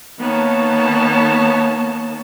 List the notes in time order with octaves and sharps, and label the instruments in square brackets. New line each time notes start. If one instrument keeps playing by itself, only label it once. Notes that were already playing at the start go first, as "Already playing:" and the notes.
[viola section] D#3 B3 A5 [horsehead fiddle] A#3 C#5